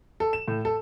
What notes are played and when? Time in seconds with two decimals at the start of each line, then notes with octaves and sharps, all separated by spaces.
0.20 A4
0.33 E7
0.48 A2
0.65 A4